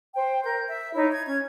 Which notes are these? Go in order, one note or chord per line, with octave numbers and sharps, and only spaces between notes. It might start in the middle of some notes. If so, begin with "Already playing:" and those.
C5 G5
A#4 G6
E5
D#4 E4 C#5
G#6
C#4 G#6